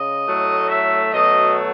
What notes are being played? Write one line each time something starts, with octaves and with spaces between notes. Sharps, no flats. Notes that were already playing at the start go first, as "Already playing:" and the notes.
Already playing: C#3 D#5
A2 F#3 A3
E5
B2 F#3 A3 D#5